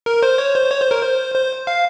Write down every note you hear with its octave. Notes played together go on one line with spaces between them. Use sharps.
A#4
C5
C#5
C5
C#5
C5
A#4
C5
C5
F5